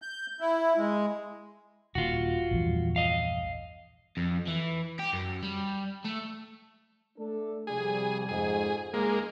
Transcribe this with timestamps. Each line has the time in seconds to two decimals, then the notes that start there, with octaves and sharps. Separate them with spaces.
0.02 G6
0.40 E4
0.77 G#3
1.95 D#1 D#2 F4 F#4
2.51 A#1 E2 G2
2.96 D#5 F5
4.17 F2
4.48 E3
4.99 G4
5.13 F#2
5.43 G3
6.04 A3
7.18 A3 D4 A4
7.67 C3 F3 G3 G#4
8.29 F2 G#2 G#4
8.94 F#1 D#2 G#3 A#3 G#4